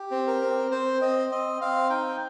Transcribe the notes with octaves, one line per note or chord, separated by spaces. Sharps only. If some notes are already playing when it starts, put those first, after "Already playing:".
Already playing: G4
C4
A#4
C4
C4 C5
C4 D#5
C4 D#5
C4 F5
D#4 G5